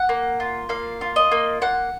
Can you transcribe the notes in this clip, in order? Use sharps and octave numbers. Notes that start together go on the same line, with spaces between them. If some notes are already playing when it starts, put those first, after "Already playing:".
Already playing: F#5
A#3
F4
A#3 F5
F4
D#5
A#3
A#3 F#5